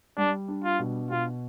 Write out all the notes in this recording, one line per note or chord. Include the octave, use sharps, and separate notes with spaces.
G3 D4
D4
F4
B2
B2 F4